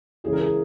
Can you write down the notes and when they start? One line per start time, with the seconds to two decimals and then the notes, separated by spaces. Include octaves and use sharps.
0.24 C#2 C#3 E3 G#4
0.33 A#4
0.41 G#4